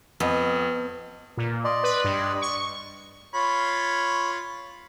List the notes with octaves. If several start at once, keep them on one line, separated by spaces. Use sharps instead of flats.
F2 B3 D#5
A#2
D5 D#5 C6
B4
G2
C#6
F4 C#5 B5